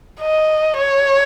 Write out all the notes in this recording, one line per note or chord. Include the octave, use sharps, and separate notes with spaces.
D#5
C#5